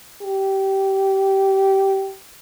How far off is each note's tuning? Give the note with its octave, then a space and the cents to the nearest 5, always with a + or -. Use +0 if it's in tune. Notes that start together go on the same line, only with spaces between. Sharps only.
G4 -20